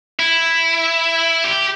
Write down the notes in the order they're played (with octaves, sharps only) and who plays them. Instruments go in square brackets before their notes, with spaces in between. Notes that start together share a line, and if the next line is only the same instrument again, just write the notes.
[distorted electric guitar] E4
G4